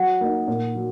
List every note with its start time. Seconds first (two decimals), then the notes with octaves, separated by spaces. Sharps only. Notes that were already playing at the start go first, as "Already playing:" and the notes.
Already playing: F#3 F#5
0.21 A#3 D#4
0.48 A#2
0.75 F#3 A#3